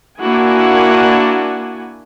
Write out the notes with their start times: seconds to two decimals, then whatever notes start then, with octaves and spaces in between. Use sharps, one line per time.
0.21 A#3 D4 E4 F#4 F#5 G#5